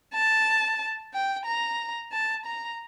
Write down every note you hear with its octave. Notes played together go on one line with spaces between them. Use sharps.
A5
G5
A#5
A5
A#5